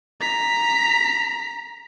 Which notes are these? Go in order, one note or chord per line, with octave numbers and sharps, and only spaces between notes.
A#5 B6